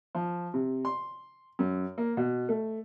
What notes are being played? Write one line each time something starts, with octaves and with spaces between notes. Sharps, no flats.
F3
C3
C6
F#2
A#3
B2
A3